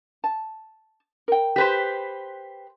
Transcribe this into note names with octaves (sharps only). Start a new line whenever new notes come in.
A5
A#4 G5
G4 B4 C5